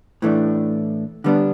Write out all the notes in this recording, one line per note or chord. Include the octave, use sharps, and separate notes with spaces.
A2 E3 A3 D4
D3 G3 B3 D4